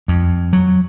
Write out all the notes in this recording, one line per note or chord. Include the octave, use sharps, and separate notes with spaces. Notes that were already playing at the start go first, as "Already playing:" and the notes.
F2
F#3